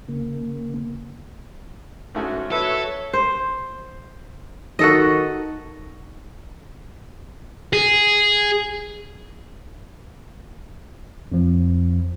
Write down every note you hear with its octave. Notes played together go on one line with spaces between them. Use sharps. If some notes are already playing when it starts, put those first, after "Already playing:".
C#3 A#3
G#2 A3 C#4 F#4
F#4 A4 B4 C#5 E5
C5
D#3 F#4 A4 D#5
G#4
F2 F3